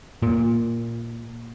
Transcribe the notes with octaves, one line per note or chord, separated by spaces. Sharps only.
A#2